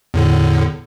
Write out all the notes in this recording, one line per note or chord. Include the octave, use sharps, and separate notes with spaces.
E2 A2 D3